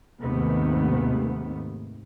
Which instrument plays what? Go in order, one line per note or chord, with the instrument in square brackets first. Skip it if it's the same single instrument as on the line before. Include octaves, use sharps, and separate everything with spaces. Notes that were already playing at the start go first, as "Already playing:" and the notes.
[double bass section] D#2 G#2 C3 D#3 A3 B3